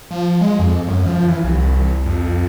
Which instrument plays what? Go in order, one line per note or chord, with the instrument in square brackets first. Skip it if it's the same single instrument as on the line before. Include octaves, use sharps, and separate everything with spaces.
[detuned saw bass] F3
G#3
F2
F#2
F3
E3
C2
F2